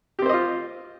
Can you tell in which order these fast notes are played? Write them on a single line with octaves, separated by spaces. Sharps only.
G4 C4 C5 D#5 F4